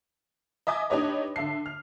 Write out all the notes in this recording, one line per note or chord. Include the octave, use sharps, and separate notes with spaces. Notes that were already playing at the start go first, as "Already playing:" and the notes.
D#5 E5 G#5 D6 D#6
D4 D#4 G4 B4 C#5 D#5
D3 E5 A5 C7
F6